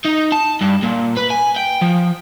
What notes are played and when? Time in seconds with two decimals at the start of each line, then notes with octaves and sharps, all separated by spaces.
0.05 D#4
0.32 A5
0.61 G2
0.83 A#2
1.17 B4
1.31 G#5
1.57 G5
1.82 F3